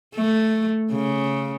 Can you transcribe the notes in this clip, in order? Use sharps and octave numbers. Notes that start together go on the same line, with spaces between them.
A3
C#3